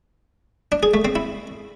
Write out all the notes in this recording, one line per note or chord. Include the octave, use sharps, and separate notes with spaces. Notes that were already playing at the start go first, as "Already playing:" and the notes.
D4
G#4
A3
C4
E4